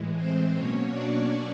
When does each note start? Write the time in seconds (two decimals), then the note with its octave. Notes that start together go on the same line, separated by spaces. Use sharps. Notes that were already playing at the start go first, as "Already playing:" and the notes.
Already playing: A2 E3 G#3
0.18 C4 C5
0.54 B2 F#3 A#3 C#4 C#5
0.91 D4 D5